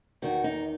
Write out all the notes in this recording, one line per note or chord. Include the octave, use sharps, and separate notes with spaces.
E2 D#3 F#4
D#4